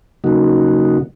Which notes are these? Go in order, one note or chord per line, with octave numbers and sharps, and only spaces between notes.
C#3 F#3 A#3 D#4 F#4